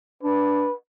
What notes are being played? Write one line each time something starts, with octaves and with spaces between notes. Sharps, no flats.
D4 B4